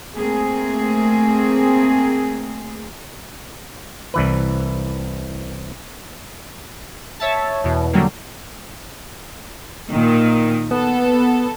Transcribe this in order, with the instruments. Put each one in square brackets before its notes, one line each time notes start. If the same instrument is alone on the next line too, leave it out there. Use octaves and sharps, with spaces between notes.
[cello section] A3 A#3 C4 G#4
[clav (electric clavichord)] C2 E3 B4
[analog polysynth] C#5 E5 A5
E2 B2
D3 F#3 G3 A#3
[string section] A#2 D#3
[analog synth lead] B3 [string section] A4